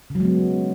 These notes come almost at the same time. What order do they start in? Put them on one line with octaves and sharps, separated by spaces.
C#3 F#3 G#3 B3